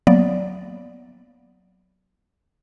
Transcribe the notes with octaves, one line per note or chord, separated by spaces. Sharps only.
F#3 A#3 B3 D5